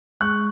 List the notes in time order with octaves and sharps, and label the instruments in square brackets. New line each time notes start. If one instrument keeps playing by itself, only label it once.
[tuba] G#3 [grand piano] C#6 F#6